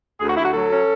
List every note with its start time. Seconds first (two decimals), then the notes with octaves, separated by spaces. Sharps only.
0.20 D2 G#4
0.28 F#4
0.37 D2 E4
0.45 F#4
0.54 F#3 A4
0.71 C#4